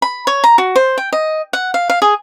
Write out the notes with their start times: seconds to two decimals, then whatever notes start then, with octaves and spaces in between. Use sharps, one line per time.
0.02 B5
0.27 C#5
0.44 A#5
0.58 F#4
0.76 C5
0.98 G5
1.13 D#5
1.53 F#5
1.74 F5
1.90 F5
2.02 G#4